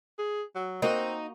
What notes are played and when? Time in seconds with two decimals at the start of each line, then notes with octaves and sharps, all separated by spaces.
0.19 G#4
0.55 F#3
0.82 A#3 C4 D#4 F#4